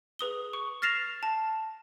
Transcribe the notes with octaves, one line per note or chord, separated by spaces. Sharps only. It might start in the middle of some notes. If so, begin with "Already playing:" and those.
G#4 B4 D#6 G7
C#6
F6 A6 A#6 C7 E7 F7
A5